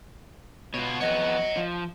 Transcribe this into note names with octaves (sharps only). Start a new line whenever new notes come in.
B2 F4 C#5
F2 B3 C#5 D#5 F#5
F3